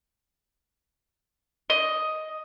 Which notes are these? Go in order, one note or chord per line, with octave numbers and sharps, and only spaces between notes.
D#5